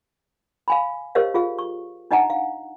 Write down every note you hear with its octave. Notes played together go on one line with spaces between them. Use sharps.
F5 G#5 B5
G4 A#4 C5 C#5 D#5 F5
F4 G#4 F5
C#6
D4 D#4 D#5 F#5 G#5 A#5
F5